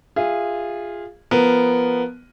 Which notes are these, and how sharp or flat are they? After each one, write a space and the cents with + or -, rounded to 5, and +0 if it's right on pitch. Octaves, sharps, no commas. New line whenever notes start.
F4 +0 G#4 -20 E5 +5
F3 +0 B3 +0 A#4 +0